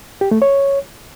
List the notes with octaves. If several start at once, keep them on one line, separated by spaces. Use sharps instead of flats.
G4
A3
C#5